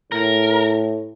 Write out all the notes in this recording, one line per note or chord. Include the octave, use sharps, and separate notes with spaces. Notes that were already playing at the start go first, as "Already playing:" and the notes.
A2 A#4